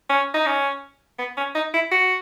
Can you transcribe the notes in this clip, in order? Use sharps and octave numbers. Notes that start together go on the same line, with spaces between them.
C#4
D#4
C#4
B3
C#4
D#4
E4
F#4